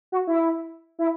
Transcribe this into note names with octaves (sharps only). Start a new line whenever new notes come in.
F#4
E4
E4